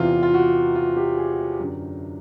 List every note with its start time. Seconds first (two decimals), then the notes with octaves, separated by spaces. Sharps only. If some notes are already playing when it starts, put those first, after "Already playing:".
Already playing: E2 C3 E3 F4
0.23 F4
0.34 F#4
0.75 F4
0.97 G4
1.17 G#4
1.59 F#2 D3